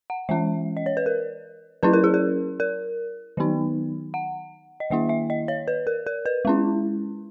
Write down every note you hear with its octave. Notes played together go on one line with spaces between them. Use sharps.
F#5
E3 G#3 C#4 E5
D#5
C#5
B4
A#4
F#3 C#4 E4 B4
A#4
G#4
A#4
A#4
D#3 F#3 B3 D#4
F#5
D#5
D#3 A#3 E4 E5
E5
D#5
C#5
B4
A#4
A#4
B4
G#3 C#4 E4